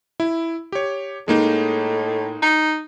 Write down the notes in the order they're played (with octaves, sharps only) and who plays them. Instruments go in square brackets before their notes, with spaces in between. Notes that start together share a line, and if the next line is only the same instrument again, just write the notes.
[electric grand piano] E4
G4 C#5
[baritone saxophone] A2 [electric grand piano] G#3 A#3 D#4
[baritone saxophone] D#4